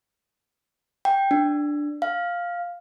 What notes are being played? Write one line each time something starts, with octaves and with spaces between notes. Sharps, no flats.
G5
D4
F5